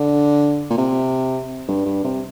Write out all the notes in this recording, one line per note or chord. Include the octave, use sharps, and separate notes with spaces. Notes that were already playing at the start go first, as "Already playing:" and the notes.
Already playing: D3
A#2
C3
G2
G2
C3